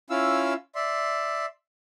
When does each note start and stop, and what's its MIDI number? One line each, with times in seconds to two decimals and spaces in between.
0.10 0.54 61
0.10 0.54 64
0.10 0.54 65
0.10 0.54 77
0.10 0.54 88
0.75 1.46 74
0.75 1.46 76
0.75 1.46 84